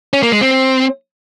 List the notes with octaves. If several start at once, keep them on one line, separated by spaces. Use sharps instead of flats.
C#4
A#3
G#3
C4